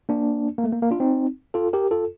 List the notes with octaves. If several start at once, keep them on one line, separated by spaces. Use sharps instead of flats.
A#3 D4
A#3
A3
A#3
A#3
D4 F4
C4 D#4
F4 A4
G4 A#4
F4 A4